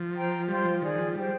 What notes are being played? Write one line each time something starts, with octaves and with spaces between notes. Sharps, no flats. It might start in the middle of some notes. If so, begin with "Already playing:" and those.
Already playing: F3
C5 G5 A#5
G3 F4 C5 G5 C6
F3
D#3 G#4 D5 G#5
F3
G3 G#4 C5 G5